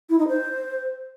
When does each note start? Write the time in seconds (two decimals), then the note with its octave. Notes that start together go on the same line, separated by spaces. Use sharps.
0.10 E4
0.19 D#4
0.28 C5